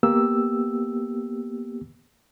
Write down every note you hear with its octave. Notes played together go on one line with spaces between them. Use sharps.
A#3 B3 G4 E6